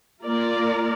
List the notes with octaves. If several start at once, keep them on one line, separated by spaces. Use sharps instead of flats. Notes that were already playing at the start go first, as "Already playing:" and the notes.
A#3 F4 A#4 D5